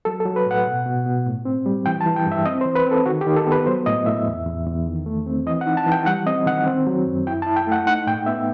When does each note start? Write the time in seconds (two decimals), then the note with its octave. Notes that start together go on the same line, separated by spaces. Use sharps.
0.05 F#3 A4
0.20 A4
0.25 F#3
0.36 B4
0.46 A2 F#5
0.66 B2
0.86 B2
1.06 B2
1.27 A2
1.45 C4
1.66 G3
1.86 E3 G5
2.01 A5
2.06 E3
2.16 G5
2.26 G2
2.32 E5
2.46 C4 D#5
2.61 C5
2.66 E3
2.76 B4
2.86 C4 A4
3.06 D#3 F#4
3.21 G4
3.27 D#3
3.36 A4
3.47 B3
3.52 B4
3.66 F#3 C5
3.86 A2 D#5
4.06 A2 E5
4.27 E2
4.46 E2
4.67 E2
4.86 D#3
5.06 A3
5.26 C4
5.46 E3 D#5
5.61 F#5
5.66 D#4
5.77 A5
5.86 E3
5.92 G5
6.06 G3 F#5
6.27 C4 D#5
6.46 D#3 F#5
6.66 C4
6.87 F#3
7.06 F#2
7.27 E4 G5
7.42 A5
7.46 E4
7.56 G5
7.67 A3 F#5
7.86 D#4 F#5
8.07 A2 G5
8.26 B3 E5